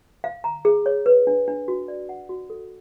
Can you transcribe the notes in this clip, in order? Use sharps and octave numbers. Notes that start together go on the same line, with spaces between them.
F5
A#5
G#4
C#5
B4
D4
D4
F#4
D5
F#5
F#4
A4